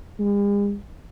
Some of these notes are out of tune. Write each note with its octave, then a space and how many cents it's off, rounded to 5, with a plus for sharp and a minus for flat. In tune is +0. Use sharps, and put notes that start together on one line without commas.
G#3 -45